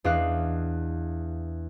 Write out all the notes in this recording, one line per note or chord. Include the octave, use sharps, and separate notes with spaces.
E2 D4 D#5 F5 F#6